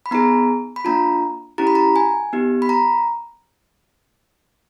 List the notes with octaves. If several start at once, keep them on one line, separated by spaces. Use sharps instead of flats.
B5
B3 D#4 G#4 A#5
B5
A#3 D4 F4 A#5
C#4 E4 G4 A#5
B5
A#5
G#5
B3 D#4 G4
B5
A#5